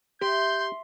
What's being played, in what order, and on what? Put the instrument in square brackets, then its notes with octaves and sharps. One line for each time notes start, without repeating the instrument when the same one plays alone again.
[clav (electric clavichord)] G4 [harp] E5 [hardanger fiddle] C6 [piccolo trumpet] G6